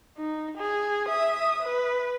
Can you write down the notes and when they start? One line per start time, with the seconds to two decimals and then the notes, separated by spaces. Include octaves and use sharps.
0.17 D#4
0.57 G#4
1.08 E5 D#6
1.62 B4